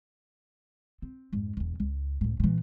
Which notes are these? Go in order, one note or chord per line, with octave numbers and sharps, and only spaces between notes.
C4
F2 G#2
E1 E2
C#2
C#2 A2
A#2 E3